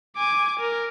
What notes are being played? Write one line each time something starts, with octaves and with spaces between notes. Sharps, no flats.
G#5 D6
A#4